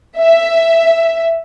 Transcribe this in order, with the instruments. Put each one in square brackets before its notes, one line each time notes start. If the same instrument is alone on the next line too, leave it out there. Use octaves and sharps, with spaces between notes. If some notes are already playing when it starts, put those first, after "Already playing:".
[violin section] E5